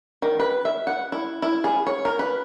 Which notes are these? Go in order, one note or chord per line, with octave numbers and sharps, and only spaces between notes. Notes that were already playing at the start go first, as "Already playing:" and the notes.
D#3
B4
E5
F#5
E4
E4
G#4
C#5
A#4
B4